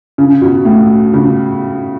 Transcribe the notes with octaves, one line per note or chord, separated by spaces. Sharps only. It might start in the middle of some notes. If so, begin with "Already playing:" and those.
C#3
B2
A2
C#3